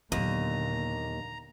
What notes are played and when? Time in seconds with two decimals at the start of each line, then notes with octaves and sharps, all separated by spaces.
0.12 D#2 A#2 D3 F#3 B3 A#5